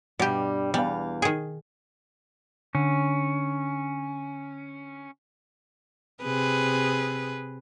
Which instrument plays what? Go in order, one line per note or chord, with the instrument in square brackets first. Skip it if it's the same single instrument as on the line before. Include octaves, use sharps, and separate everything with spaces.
[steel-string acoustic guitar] G2 G3 [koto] B2 G4
[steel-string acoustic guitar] E2 F5 [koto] G3
[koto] D#3 G#4
[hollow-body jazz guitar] D3 [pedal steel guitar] C#4
[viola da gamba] C3 G#4 B4